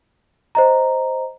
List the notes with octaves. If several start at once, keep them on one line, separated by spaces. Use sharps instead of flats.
C5 D#5 A#5